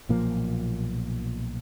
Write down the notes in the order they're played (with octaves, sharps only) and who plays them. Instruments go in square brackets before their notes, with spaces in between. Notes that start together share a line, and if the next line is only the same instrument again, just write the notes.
[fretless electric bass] B1 A#2 F3 A#3